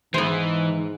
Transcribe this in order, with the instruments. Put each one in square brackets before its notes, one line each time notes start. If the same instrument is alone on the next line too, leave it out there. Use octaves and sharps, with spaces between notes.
[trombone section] G#2 [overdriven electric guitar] E3 [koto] B3 C5